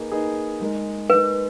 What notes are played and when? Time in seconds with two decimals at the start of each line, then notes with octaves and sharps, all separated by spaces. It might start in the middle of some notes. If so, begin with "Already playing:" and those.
Already playing: A#3 D#4 G#4 B4
0.12 A#3 D#4 G#4 B4
0.61 G#3 D#4 A#4
1.10 G#3 D#4 A#4 B4